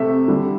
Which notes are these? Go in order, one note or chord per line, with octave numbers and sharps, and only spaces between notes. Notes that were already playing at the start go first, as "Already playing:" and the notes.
Already playing: C3 A3 E5
D3 G3